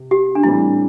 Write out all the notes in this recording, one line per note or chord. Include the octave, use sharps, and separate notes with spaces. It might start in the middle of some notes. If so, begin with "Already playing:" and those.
Already playing: C3
G4
D4
A2 E3 G3 C4 E4